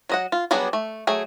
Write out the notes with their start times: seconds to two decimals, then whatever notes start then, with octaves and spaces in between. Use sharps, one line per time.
0.09 F#3 D#5 F#5
0.32 F4
0.51 F#3 G3 B3 D4 G#4
0.73 A3
1.07 F#3 A3 G#4